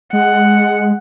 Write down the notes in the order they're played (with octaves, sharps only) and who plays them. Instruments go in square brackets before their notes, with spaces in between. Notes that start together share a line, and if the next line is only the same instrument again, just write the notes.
[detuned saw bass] G#3 [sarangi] F#5